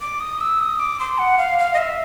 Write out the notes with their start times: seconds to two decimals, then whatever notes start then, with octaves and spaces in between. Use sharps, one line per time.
0.01 D6
0.20 D#6
0.41 E6
0.60 D#6
0.79 D6
1.00 C6
1.18 F#5
1.38 F5
1.59 F5
1.74 D#5
1.78 E5